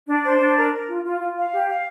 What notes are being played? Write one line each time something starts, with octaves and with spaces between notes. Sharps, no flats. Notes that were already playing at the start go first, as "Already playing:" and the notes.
D4
C5
D4
A#4
A#4
F4
F4
F4
F5
G4
F5